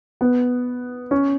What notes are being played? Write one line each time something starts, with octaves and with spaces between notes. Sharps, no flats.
B3
C#4